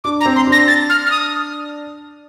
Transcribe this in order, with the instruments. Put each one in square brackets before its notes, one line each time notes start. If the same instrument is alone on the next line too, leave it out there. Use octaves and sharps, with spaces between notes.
[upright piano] D4 [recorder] D6
[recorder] A#5
[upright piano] C4
[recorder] C6
[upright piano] D4
[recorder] A#6
A6
F6
F6
D#6